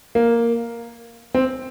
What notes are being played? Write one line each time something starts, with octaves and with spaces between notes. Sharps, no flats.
A#3
C4